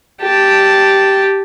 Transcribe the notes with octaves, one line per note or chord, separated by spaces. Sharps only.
G4 A5